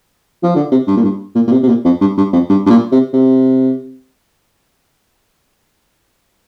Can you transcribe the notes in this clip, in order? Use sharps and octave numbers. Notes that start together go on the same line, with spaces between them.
F3
D3
C3
G2
A#2
G2
A#2
A#2
C3
C3
A#2
F2
G2
G2
F2
G2
G2
A#2
C3
C3